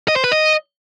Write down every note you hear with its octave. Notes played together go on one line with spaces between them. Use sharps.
D#5
C5
B4
D#5